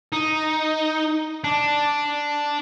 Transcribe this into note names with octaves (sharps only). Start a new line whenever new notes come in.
D#4
D4